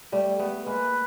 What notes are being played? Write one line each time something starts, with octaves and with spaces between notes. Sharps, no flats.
G3 A3
A3 B3
G#3 A#3 B4